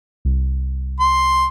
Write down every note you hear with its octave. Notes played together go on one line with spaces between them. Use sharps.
C2
C6